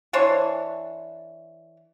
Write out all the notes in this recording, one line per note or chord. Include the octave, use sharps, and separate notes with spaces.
E3 D4 C5 C#5